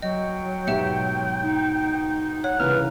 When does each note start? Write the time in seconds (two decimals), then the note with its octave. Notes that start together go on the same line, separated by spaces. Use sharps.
0.02 F#3 D#5 G5
0.67 G#2 B2 G4 E5 C#7
1.43 D#4
2.44 C#5 F#5
2.60 C2 C#3 E3 B4 F6